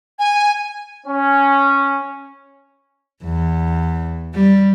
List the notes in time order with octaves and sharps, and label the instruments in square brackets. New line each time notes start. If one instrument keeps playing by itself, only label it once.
[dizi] G#5
[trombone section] C#4
[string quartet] E2
G3